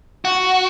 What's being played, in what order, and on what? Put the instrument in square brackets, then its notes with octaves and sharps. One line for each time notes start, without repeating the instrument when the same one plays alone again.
[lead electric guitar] F#4